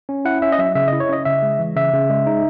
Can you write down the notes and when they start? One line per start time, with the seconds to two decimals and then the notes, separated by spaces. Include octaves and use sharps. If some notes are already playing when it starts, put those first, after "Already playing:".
0.09 C#4
0.25 E4 F#5
0.42 C#4 E5
0.52 D#5
0.59 F#3 E5
0.75 C#3 E5
0.88 E4 D#5
1.00 C#5
1.09 C#4 D#5
1.25 C#3 E5
1.43 G#3
1.59 E3
1.76 C#3 E5
1.93 C#3
2.10 G#3
2.27 D#4